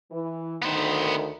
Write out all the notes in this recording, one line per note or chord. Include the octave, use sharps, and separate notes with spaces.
E3
D2 D#3 B3 C5